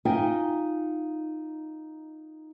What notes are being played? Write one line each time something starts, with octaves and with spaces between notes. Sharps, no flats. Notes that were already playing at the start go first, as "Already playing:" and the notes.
D#4 F4 E5 G5 G#5